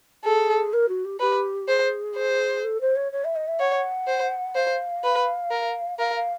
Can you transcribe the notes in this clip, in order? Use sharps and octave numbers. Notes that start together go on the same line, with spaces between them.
G#4 A4
A#4
F#4
G4
G4 B4
G#4 C5
C5
A4
C5
C#5
C#5
E5
D#5
E5
C#5 F#5
C5
C5 F5
B4
A#4
A#4 F5
F5